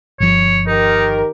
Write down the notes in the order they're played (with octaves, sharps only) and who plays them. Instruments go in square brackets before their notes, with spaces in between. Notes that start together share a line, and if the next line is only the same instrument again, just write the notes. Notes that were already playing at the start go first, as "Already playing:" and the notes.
[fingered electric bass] G1 F3 [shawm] C#5
[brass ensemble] D#3 G4 A#4 [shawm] D#4